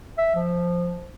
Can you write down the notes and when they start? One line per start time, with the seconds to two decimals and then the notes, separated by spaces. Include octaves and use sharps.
0.18 E5
0.35 F3